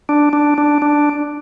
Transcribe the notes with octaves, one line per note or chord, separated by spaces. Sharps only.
D4
D4
D4
D4